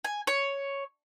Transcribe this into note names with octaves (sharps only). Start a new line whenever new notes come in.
G#5
C#5